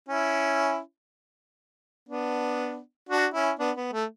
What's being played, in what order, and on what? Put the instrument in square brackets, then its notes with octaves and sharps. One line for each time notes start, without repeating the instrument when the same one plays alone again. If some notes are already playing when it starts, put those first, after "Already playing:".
[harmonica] C#4 E4
B3 D4
D4 F#4
C#4 E4
B3 D4
B3
A3